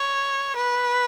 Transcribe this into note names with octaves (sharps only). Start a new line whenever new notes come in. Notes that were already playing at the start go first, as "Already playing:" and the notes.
Already playing: C#5
B4